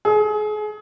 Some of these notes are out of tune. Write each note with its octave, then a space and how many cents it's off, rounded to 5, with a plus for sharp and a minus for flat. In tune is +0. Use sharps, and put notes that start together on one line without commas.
G#4 +35